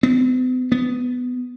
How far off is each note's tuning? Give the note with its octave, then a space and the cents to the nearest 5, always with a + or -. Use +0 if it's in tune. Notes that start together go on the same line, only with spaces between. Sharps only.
B3 +45
B3 +10